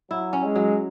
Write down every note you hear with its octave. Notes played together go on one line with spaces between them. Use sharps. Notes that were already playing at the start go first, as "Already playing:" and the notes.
F#3 E4
C#4
G#3
F#3